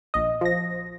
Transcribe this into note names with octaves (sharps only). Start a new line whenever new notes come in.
A#1 D#5
F3 A#6